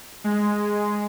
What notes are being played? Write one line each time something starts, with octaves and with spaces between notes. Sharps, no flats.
G#3